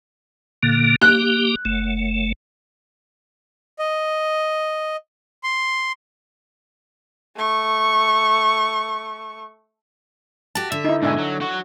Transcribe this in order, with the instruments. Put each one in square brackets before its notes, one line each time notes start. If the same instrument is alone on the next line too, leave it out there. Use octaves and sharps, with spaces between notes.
[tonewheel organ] A#2 D3 A#3
[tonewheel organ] A#3 G4 [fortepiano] F#6
[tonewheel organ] F#1 A3
[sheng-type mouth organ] D#5
C6
[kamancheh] A3 C#6
[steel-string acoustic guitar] F#4 G4 [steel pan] A5
[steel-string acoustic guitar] D3 [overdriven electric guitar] E5
[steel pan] D#4 E4
[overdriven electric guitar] G#2 B2 [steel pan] D4 E5 G#5
[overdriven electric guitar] F#3
F#3 F#4